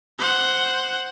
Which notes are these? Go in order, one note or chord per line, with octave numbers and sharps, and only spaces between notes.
C5 F#5